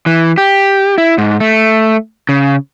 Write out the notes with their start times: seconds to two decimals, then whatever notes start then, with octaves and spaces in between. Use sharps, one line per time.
0.06 E3
0.38 G4
0.98 E4
1.18 G#2
1.40 A3
2.29 C#3